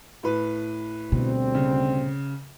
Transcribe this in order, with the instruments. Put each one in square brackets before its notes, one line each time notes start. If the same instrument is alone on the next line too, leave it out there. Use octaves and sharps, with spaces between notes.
[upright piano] A2 B4
[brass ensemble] D2 G3 C4 [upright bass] B2
[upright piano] C#3